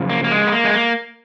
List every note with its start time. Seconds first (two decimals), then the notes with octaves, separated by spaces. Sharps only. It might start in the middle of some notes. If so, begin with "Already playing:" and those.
Already playing: F#2 C#3 F3
0.10 A#3
0.24 A#3
0.31 G#3
0.47 B3
0.52 A#3
0.64 G#3
0.74 A#3